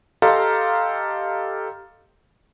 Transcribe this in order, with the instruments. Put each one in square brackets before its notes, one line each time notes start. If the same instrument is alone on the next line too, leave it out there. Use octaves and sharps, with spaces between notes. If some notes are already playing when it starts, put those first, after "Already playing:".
[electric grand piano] G4 A4 D#5 F5 A#5 C6